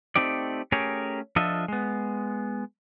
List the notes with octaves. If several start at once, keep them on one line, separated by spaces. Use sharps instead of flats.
A3 C4 D#4 G4 D5
A3 C#4 G4 G#4 A#4 C#5
F3 D4 F4 A4 D#5 E5
G#3 B3